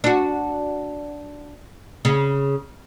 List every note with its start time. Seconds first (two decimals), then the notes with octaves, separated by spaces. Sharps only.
0.04 D4 F#4
2.05 C#3